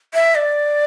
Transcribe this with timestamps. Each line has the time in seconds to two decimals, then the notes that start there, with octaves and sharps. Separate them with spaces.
0.14 E5
0.35 D5